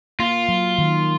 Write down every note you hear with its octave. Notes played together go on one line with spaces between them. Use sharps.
A#3 F4
F#3
D#3